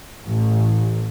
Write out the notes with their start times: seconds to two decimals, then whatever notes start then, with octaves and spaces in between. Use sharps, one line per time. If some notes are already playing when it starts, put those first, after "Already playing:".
0.23 A1